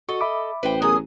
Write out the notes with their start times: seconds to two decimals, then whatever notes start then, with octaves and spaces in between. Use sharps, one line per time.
0.09 F#4 A4 D#5 C#6
0.21 E5 B5 D6
0.63 A1 B4 C5 G5
0.82 F#3 B3 G#4 A#4 G#5 D#6